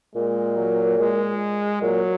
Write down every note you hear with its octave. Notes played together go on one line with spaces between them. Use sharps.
A#2 G#3
F#3
G#3
A#2 F#3